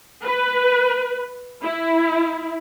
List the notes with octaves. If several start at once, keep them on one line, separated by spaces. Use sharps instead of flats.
B4
E4